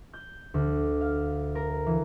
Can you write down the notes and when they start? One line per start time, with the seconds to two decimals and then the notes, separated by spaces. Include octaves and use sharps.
0.13 G6
0.54 D2
1.01 F5
1.55 A#4
1.86 E3